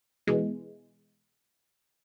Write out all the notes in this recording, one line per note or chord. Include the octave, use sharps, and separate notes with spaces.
B2 E3 G#3